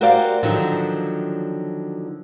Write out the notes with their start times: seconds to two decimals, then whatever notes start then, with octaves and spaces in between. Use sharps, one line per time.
0.01 F#4 G4 A#4 C5 D5 F5
0.43 D3 D#3 F3 F#3